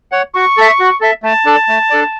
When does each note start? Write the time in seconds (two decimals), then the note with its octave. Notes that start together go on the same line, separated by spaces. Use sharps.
0.12 C#5 F#5
0.34 F#4 C#6
0.57 A4 E5
0.80 F#4
1.01 A4 E5
1.23 A3 A5
1.45 D4 A4 D5
1.69 A3
1.90 D4 A4 D5